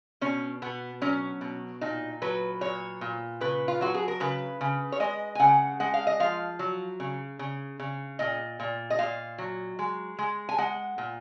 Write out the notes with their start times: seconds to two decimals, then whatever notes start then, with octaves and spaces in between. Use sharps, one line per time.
0.21 B2 C#4
0.62 B2 B3
1.02 F#3 C#4
1.41 B2
1.81 A#2 D#4
2.22 F#3 B4
2.61 A#2 C#5
3.01 A#2
3.41 C#3 B4
3.68 F4
3.81 F#3 F#4
3.94 G#4
4.08 A#4
4.20 C#3 B4
4.61 C#3
4.92 C#5
5.00 G#3 D#5
5.35 G#5
5.40 C#3 F#5
5.80 G#3 F#5
5.94 F5
6.07 D#5
6.20 F3 F5
6.59 F#3
7.00 C#3
7.39 C#3
7.80 C#3
8.19 A#2 D#5
8.60 A#2
8.90 D#5
8.99 A#2 F5
9.38 F#3
9.79 G#3
10.19 G#3
10.49 G#5
10.58 G#3 F#5
10.98 A#2